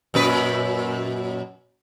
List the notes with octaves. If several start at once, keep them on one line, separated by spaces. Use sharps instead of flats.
F#2 A#2 B4